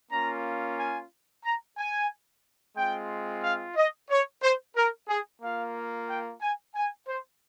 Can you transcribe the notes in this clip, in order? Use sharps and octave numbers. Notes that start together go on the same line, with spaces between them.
A#3 C#4 F4 A#5
G#5
A#5
G#5
G#3 C4 F4 G5
F5
D#5
C#5
C5
A#4
G#4
A#3 F4 F5
G5
G#5
G#5
C5